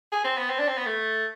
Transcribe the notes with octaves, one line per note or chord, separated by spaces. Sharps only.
G#4
C4
B3
C4
D4
C4
B3
A3